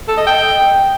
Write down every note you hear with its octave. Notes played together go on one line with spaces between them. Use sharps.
A4
D#5
G5